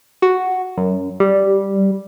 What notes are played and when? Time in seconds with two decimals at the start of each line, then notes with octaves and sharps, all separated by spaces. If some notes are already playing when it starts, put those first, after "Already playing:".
0.22 F#4
0.78 F#2
1.20 G3